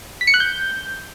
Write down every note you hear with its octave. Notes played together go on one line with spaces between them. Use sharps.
B6
C#7
F#6
G6